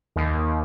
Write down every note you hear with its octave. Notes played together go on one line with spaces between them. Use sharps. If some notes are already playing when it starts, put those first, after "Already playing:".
D#2